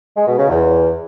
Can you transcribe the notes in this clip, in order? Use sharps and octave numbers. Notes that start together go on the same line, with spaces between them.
G#3
B2
C#3
E2